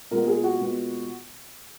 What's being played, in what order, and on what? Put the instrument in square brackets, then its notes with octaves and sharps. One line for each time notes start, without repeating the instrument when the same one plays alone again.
[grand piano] A#2 G#3 B3 A#4
G#4
F#4
A#2 G#3 B3